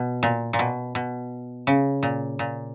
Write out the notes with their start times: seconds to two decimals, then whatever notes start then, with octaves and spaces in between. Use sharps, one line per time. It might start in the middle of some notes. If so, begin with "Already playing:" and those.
Already playing: B2
0.23 A#2
0.53 A#2
0.59 B2
0.95 B2
1.67 C#3
2.03 A#2
2.39 A#2